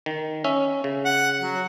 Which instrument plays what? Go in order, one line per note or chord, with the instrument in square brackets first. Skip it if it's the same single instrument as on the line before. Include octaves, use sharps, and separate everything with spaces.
[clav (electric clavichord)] D#3
C#4 E5
C#3
[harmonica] F#5
F#3